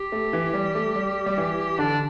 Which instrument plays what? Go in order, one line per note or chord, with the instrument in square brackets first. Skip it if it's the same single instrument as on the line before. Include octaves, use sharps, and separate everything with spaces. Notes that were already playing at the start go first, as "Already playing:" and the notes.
Already playing: [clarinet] G4
[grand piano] A3
E3
G3
A3
G3
G3
E3
[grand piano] D3 [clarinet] D4